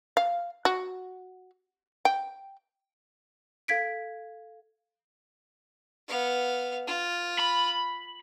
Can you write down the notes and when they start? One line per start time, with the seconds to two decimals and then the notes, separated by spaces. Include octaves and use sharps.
0.17 F5
0.65 F#4
2.05 G5
3.68 A4 F5 G#6 B6 D7
6.08 B3 F5
6.87 F4
7.40 B5